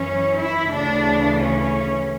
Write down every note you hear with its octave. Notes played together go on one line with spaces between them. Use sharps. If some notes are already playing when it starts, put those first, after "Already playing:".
Already playing: F#2 E3 C#4
E4
D2 C#3 E3 D4
C#4